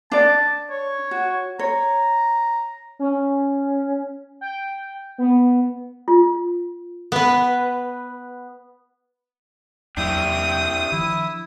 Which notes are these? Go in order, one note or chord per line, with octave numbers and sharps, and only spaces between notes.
D4 D5 A5
C#5
F#4
C#5 A#5
C#4
G5
B3
F4
B3 B4
E2 F#3 A#3 D4 E4 G4 G5 D#6
D#3 F3 D4 E4